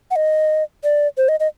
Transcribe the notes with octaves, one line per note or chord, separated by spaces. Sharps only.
F#5
D#5
D5
C5
D#5
D#5